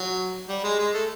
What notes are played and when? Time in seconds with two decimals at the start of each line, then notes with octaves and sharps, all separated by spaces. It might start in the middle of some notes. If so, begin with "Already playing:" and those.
Already playing: F#3
0.49 G3
0.64 G#3
0.79 G#3
0.94 A3